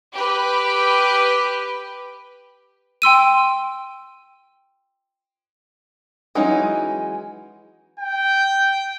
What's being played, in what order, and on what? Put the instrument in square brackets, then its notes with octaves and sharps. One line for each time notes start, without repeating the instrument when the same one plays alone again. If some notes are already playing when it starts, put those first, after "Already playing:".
[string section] G4 B4
[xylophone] G5 C6 E6 D#7
[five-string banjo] E3 F#3 G#3 C#4 D#4
[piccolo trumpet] G5